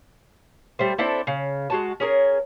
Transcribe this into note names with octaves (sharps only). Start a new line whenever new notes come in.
G3 A3 C5
C4 D4 E4 A4
C#3
G#3 F#4 A5
C#4 G#4 A#4